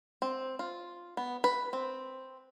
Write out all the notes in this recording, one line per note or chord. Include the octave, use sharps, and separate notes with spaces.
C4
F4
B3
B4
C4